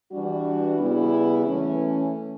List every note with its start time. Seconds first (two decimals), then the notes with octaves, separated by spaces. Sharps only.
0.11 E3 G3 D4 F#4
0.78 C#3 G3 B3 E4
1.46 E3 A3 C#4